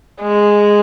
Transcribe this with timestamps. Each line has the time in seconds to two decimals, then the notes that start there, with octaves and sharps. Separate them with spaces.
0.22 G#3